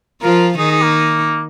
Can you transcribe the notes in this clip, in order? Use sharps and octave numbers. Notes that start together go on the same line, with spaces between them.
F3 F4 A#4
D#3 D#4 G#4
G#4
A#3